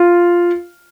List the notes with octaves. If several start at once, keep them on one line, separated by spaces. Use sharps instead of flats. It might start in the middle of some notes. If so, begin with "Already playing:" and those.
Already playing: F4